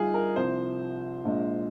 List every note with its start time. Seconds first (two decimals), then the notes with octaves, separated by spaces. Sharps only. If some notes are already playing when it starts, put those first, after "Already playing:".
Already playing: G1 G2 G3 D#4 F4 G#4
0.14 A#4
0.36 C2 C3 F3 C5
1.25 A#1 A#2 G#3